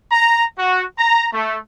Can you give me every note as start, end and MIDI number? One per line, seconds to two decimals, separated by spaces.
0.12 0.44 82
0.59 0.83 66
0.98 1.28 82
1.33 1.58 57